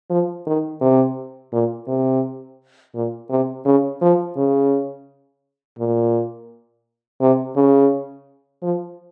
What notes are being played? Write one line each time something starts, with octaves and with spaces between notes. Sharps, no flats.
F3
D#3
C3
A#2
C3
A#2
C3
C#3
F3
C#3
A#2
C3
C#3
F3